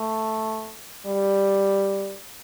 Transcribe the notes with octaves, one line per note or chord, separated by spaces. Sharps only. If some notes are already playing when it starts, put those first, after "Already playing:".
Already playing: A3
G3